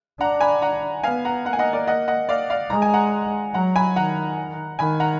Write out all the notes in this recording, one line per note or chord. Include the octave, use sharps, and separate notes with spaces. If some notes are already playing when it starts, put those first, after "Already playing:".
D4 F#5 A#5
G#5 B5
F#5 A#5
B3 F5 G#5
F#5 A#5
A#3 F#5 A#5
G#5
D#5 F#5
A#4 D5
D#5 F#5
D#5 F#5
D5 F5
D5 F5
G#3 A#5
G#5
F#5 A#5
F#3 F#5 A#5
G#5 B5
D#3 F#5 A#5
D#3 G#5 B5
F#5 A#5